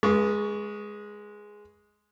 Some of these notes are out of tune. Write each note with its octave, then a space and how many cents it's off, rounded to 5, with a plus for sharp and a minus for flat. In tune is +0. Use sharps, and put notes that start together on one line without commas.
G#3 +0 B4 -35 C#6 +10